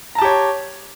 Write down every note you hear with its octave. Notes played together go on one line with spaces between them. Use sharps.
G4 C#5 A5 A#5